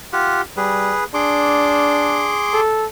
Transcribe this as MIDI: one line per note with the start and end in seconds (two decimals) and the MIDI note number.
0.13 0.41 65
0.13 0.41 67
0.13 0.41 78
0.57 0.94 55
0.57 1.04 68
0.57 1.04 71
1.14 2.41 62
1.14 2.61 68
1.14 2.61 84
1.14 2.61 86
2.53 2.87 69